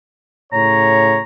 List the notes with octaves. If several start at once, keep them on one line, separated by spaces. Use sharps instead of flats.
A2 C#3 C#5 A#5